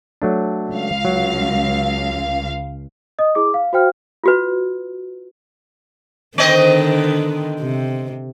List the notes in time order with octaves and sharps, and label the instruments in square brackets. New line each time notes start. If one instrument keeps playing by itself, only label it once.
[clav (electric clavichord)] F#3 A3 D4
[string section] C#2 F5
[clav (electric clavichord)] F#3
[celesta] D#5 D#6
E4 G#4 D6
F5
F#4 C5 F5 G5 F6
[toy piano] F4 F#4 B4
[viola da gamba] D3 D#3 [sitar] B3 C4 D#5
[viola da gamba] C3